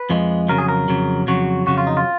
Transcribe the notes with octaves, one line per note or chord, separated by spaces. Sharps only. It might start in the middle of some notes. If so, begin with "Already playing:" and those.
Already playing: B4
F2 F3 G#3
F2 C#3 F#3 A#4
G#4
A#4
F2 C#3 F#3
F2 C#3 F#3 F#4
F2 C#3 F#3 F#4
F4
D#4
F4